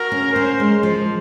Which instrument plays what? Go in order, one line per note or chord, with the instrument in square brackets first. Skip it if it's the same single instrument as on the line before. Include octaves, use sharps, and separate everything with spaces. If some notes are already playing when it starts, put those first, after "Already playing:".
Already playing: [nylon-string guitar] F#4 [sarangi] A#4
[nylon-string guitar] C#4
[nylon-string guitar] C#4 [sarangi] C5
[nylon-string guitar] G#3
F3